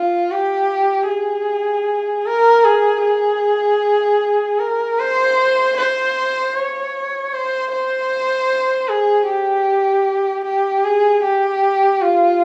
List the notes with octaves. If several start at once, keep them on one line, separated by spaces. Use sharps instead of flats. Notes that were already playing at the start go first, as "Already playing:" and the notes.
Already playing: F4
G4
G#4
A#4
G#4
G#4
A#4
C5
C5
C#5
C5
C5
G#4
G4
G4
G#4
G4
F4